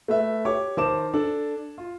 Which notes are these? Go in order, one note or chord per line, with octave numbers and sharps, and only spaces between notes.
A3 B4 E5
G4 C#5 D6
D#3 C5 A5 D6 E7
D4 A4
F4